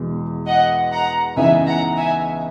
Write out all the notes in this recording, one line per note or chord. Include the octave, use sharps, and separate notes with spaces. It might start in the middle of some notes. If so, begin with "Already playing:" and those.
Already playing: E2 B2 G#3
D#5 F#5
F#5 A#5
C#2 C#3 E3 B3 D#4 E5 G#5
F#5 A#5
E5 G#5